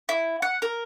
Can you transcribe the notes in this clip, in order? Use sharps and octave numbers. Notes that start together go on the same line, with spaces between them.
E4
F#5
A#4